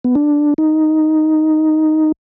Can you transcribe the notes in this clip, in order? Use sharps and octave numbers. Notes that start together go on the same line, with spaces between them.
B3
D4
D#4